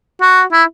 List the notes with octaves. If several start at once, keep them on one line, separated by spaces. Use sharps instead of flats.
F#4
E4